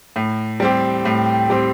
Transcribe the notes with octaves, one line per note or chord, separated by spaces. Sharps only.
A2
G3 C4 G4
A2
G3 C4 G4